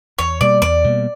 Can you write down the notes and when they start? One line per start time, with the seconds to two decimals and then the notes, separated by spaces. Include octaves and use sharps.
0.18 E2 C#5
0.40 B2 G3 A#3 D5
0.62 E2 D5
0.84 B2 G3 A#3